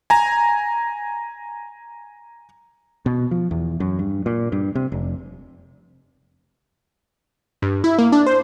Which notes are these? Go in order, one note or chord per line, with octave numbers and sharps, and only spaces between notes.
G#5 A#5
B2
F3
E2
F#2
G2
A#2
G2
C3
F1
G2
E4
A#3
D4
C5